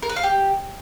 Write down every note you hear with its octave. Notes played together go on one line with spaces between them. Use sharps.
A#4
B4
F5
G4